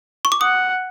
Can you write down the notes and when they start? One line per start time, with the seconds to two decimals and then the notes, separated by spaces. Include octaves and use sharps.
0.25 C#6
0.32 D6
0.41 F#5 D#6